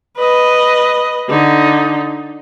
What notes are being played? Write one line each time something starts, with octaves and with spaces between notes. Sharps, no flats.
B4 D#5
D3 D#4